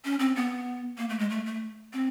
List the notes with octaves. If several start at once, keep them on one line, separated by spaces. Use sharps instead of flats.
C#4
C4
B3
A#3
A3
G#3
A3
A3
C4